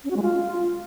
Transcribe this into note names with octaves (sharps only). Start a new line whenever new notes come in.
C#4
F#4
G#3
F4